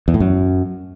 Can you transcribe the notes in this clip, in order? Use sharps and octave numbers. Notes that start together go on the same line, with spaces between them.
E2
A2
F#2